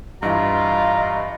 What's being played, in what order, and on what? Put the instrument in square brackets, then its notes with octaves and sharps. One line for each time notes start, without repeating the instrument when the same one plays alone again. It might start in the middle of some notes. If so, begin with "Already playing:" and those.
[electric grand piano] G2 E3 [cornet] F4 [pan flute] D#5 [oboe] A#5